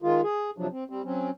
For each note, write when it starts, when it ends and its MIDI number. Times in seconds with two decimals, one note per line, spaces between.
0.02 0.21 51
0.02 0.21 56
0.02 0.21 65
0.23 0.51 68
0.58 0.67 48
0.58 0.67 53
0.58 0.67 54
0.58 0.67 62
0.72 0.84 60
0.90 1.02 55
0.90 1.02 60
1.04 1.30 54
1.04 1.30 60
1.04 1.30 61